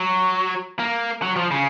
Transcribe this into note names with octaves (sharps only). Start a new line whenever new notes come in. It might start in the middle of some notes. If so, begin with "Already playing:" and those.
Already playing: F#3
A#3
F#3
F3
C#3